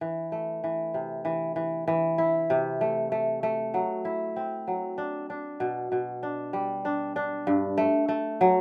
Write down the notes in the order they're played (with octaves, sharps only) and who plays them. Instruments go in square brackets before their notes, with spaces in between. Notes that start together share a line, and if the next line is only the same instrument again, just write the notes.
[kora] E3
A3
E3
C3
E3
E3
E3
E4
C3
A3
A3
A3
F#3
E4
C4
F#3
D4
D4
B2
B2
D4
G3
D4
D4
G2
A3
A3
F#3